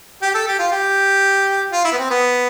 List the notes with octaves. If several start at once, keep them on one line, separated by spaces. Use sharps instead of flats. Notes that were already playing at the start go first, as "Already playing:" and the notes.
G4
A4
G4
F4
G4
F4
E4
B3
C4
B3